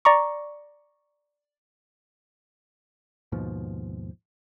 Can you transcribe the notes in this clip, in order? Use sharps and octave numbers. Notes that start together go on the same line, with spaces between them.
D5 A#5 C#6
D#2 G#2 B2 F3